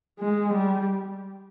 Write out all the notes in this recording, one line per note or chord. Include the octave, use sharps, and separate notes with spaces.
G#3
G3